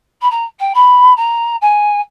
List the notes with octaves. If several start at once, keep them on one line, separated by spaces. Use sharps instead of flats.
B5
A#5
G5
B5
A#5
G#5